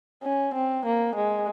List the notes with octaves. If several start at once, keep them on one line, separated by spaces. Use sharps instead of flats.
C#4
C4
A#3
G#3